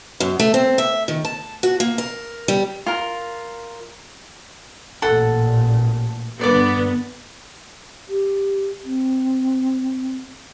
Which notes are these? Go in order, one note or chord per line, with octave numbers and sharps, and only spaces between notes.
F#2
A3
C4
E5
D#3
A5
F#4
A#3
A#4
G3
F4 A#4
A1 A#2 A4 F#5
G2 D3 B3 D5 D6
G4
C4